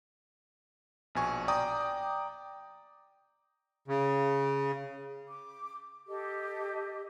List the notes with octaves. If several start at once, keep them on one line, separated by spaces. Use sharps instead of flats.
A#1 B2 G#5 C#6
D5 G5 A#5 D6 D#6
C#3
D6
G4 A4 D#5 D6